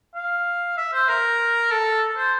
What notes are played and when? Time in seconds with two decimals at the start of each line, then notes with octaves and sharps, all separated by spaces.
0.15 F5
0.77 E5
0.93 C5
1.09 A#4
1.71 A4
2.17 C5